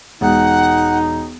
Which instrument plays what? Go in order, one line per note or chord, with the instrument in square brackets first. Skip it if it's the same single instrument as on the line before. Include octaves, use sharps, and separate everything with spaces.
[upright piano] E1 [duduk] D#4 [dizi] F#5